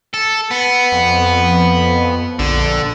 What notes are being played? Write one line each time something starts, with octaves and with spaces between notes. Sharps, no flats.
A4
B3
F2
A#1 D3